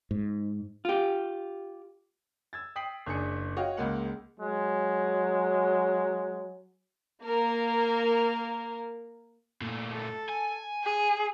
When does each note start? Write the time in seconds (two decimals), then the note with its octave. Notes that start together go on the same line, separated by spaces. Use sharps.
0.11 G#2
0.85 F4 G4
2.53 E6 G#6 A6
2.76 G5 D#6 B6 C7 F#7
3.06 F#1 D4 G#4 C#7
3.57 F#4 C#5 D#5 F5 G5
3.77 C#2 G#3 A#3 F#5
4.40 F#3 G#3
7.23 A#3 A#4
9.62 A#2 A3
9.92 A4
10.29 G#5
10.84 G#4